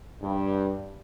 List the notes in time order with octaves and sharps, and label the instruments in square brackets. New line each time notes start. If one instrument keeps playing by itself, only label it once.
[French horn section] G2